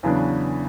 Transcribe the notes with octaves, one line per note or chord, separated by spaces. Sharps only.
E2 C#3 F#3 B3 D4